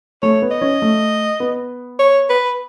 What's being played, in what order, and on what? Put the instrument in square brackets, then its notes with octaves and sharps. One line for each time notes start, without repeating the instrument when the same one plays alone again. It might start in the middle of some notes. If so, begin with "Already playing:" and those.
[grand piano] A3 [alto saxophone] C#5
[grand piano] B3
[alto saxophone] D#5
[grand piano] C#4
A3
B3
[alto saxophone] C#5
B4